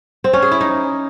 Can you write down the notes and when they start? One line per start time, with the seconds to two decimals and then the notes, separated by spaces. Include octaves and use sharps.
0.24 C4
0.33 C#4
0.42 G#4
0.51 E4
0.61 D#4